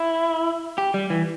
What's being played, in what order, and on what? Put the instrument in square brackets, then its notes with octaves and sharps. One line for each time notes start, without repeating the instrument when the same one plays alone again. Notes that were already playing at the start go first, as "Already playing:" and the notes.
Already playing: [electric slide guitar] E4
G4
G3
E3